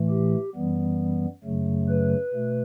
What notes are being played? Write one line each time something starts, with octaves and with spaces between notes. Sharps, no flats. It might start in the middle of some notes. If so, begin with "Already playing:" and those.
Already playing: A2 E3 A3
G4
F#2 E3 G3 B3
F#2 C#3 F#3 A3
B4
B2 A3